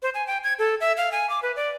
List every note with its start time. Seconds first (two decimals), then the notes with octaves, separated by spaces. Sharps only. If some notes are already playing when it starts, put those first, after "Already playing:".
0.03 C5
0.14 G#5
0.27 G5
0.44 G#6
0.59 A4
0.81 E5
0.97 F5
1.12 G#5
1.30 D6
1.43 B4
1.56 D5